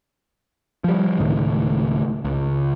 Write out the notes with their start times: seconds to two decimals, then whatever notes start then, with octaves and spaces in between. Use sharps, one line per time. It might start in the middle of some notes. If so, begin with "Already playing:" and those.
0.84 F3 G3
1.19 C#2 A2 D#3
2.24 C#2